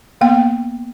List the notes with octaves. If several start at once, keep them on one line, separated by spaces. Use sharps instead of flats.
A#3 B3 G5